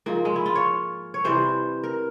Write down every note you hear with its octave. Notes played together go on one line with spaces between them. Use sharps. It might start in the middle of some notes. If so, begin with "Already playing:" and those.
G#2 F3 A#3
G#3
E4
F4
C#5
C#5
C3 E3 G3 C5
A#4